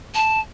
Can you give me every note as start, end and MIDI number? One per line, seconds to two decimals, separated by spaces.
0.15 0.40 81